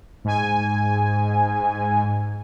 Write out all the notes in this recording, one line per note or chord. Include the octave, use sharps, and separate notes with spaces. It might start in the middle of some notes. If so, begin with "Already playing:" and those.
G#2 G#5